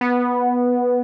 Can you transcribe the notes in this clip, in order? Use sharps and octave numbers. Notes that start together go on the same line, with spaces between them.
B3